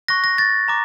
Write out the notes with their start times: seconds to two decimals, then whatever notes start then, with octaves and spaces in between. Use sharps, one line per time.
0.08 C#6 F#6 A#6
0.24 A#6
0.38 A6
0.68 A#5 D6